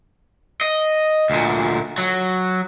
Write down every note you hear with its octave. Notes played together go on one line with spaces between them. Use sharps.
D#5
D2 A#2
F#3